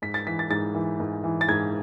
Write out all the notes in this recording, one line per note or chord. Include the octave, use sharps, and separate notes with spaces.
G#2 B6
A6
E3 B6
A6
G#2 A6
E3
G#2
E3
A6
G#2 G#6